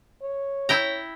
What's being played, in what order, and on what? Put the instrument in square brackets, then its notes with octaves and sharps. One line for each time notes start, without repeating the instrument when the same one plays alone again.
[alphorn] C#5
[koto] E4 G5 A#5